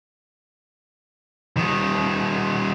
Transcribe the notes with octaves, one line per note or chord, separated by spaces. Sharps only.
D#3 G3